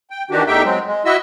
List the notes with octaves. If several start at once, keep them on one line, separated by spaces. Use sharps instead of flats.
G5
D#3 E3 D4 F#4 G4
E2 A3 D#4 G4 E5 G5
F#3 G#3 C4
G#3
E4 F#4 D#5 E5 E6